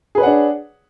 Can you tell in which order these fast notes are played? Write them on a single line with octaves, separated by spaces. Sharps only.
G#4 B4 C#5 F#5 D4